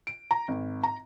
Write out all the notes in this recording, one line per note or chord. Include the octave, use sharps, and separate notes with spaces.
D7
A#5
G#1
A#5